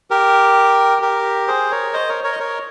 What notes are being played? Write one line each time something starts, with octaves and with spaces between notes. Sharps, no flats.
G4 A#4
G4 A#4
G#4 C5
A#4 C#5
C5 D#5
A#4 C#5
A#4 C#5
D#5
A#4 C#5